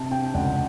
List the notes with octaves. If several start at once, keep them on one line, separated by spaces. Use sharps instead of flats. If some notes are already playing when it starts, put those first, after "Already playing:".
Already playing: C3 A5
C3 G5
C#2 F#5